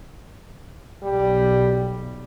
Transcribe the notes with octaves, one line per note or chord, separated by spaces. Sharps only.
B1 G3